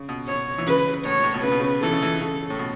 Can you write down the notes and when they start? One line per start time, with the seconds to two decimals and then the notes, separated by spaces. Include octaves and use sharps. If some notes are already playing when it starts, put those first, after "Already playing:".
Already playing: C#3
0.09 B2
0.27 B2 C#5
0.58 E3
0.67 C#3 B4
1.05 A2 C#5
1.24 A2
1.34 B2
1.43 C#3 B4
1.51 B2
1.60 C#3
1.82 E3 A4
1.92 C#3
2.02 E3
2.21 C#3 A4
2.50 A2
2.59 B2